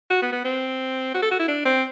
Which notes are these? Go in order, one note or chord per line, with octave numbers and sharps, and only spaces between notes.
F#4
B3
B3
C4
F#4
A4
F#4
E4
D4
C4